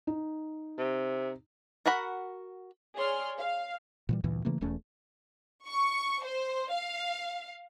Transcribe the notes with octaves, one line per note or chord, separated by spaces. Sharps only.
D#4
C3
F#4 A#4 F#5 B5
G#4 C#5 D5 C6 F6
F5
A#2 E3 G3
D2 G2 A#2 E3
C#3 E3 A3 A#3
E1 E2 A3 C#4
C#6
C5
F5